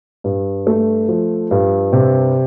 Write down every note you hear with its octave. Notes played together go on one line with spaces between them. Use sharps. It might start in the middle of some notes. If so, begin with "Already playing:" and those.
G2
A3
F3
G2
C3